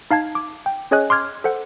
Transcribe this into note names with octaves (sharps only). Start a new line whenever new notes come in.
D#4 F5 A5 G#6
D6
G5
C#4 G#4 C#5 D#5 G#5 F#6
C6 D6 F6 G#6
A4 C5 F#5